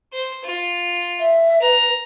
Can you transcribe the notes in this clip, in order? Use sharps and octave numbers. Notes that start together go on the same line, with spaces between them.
C5
F4
E5
B4 A#5